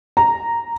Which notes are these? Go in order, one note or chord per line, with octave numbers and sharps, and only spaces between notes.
A#5